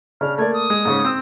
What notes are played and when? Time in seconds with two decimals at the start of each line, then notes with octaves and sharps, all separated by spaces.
0.21 C#3 D4 F6
0.38 A3 A#3 D5 G#6
0.54 D#6
0.70 G#3
0.85 G#2 C#3 C#4
1.05 C4 E6